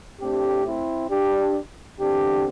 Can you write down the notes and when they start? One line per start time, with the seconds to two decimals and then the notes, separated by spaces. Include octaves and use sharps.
0.20 A2 A3 C4 D4 G4
0.66 C4 E4
1.10 D4 G4
1.99 E2 D3 C4 D4 G4